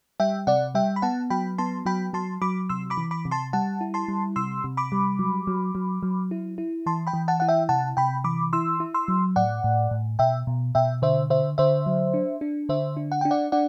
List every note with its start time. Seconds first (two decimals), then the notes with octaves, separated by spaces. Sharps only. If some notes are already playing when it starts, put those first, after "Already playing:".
0.20 G3 E5 G5
0.47 C3 D5 F#5
0.75 G3 E5 G5
0.96 B5
1.02 B3 F#5 A5
1.30 F#3 G5 B5
1.58 B3 A5 C6
1.86 F#3 G5 B5
2.13 F#3 A5 C6
2.42 F#3 B5 D6
2.69 C3 C6 E6
2.90 B5 D6
2.97 E3
3.11 B5 D6
3.25 C3
3.31 A5 C6
3.53 G3 F#5 A5
3.81 E4
3.94 A5 C6
4.08 G3
4.36 C3 C6 E6
4.64 C3
4.77 B5 D6
4.92 G3
5.19 F#3
5.47 F#3
5.75 F#3
6.03 F#3
6.31 E4
6.58 E4
6.86 E3 A5 C6
7.07 G5 B5
7.13 E3
7.28 F#5 A5
7.40 E4 F#5
7.49 E5 G5
7.69 C3 F#5 A5
7.97 C3 G5 B5
8.24 E3 B5 D6
8.53 E4 C6 E6
8.80 E4
8.94 C6 E6
9.08 F#3
9.36 A2 D5 F#5
9.64 A2
9.91 A2
10.19 B2 E5 G5
10.47 B2
10.75 B2 E5 G5
11.02 D3 C5 E5
11.30 D3 C5 E5
11.58 D3 C5 E5
11.86 F#3
12.14 D4
12.41 D4
12.69 D3 C5 E5
12.97 D4
13.12 F#5
13.21 D4 G5
13.31 D5 F#5
13.52 D4 D5 F#5